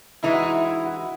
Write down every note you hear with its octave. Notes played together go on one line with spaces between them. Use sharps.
E3 G#3 D#4 E4
F#4
E4
E4
F#4